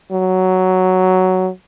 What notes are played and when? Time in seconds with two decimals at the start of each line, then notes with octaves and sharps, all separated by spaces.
0.11 F#3